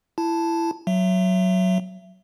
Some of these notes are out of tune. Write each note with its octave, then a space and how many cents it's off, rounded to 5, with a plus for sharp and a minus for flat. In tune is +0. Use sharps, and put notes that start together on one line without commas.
E4 +20 A5 +0
F#3 +0 E5 +25